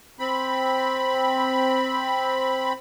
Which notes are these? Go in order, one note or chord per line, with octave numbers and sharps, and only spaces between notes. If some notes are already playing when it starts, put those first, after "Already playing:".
C4 B5